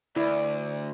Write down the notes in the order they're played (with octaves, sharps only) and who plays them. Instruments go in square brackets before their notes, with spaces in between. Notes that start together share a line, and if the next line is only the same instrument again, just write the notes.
[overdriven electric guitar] D2 [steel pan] E4 [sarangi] D5